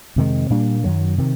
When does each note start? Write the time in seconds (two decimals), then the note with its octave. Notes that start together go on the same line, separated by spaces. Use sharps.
0.16 F2 C3 D#3 G#3
0.50 A#2 G3 A#3 D4
0.84 F#2 D#3 F#3
1.18 C3 D#3